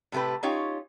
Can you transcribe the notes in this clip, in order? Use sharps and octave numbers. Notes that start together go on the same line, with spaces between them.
A2 C3 A3 G4 B4
C#4 D#4 F4 G4 C#5